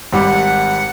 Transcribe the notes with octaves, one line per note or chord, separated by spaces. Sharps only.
G#1 G3 F#5 D6